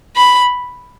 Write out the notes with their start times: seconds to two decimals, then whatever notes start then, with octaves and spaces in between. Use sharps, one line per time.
0.16 B5